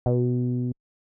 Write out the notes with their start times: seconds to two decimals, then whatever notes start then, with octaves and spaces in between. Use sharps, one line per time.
0.06 B2